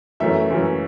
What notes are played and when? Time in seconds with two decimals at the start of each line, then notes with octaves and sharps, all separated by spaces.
0.20 F#2 E3 A3 C#4 E5
0.50 F#2 E3 A3 C#4